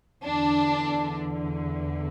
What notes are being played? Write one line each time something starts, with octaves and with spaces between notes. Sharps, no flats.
E2 D3 D4